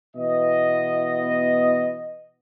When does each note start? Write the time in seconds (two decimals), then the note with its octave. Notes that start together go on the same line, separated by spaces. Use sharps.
0.16 B2 E3 B3 D#5